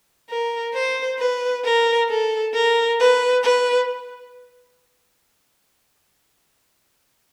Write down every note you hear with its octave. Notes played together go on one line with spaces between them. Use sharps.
A#4
C5
B4
A#4
A4
A#4
B4
B4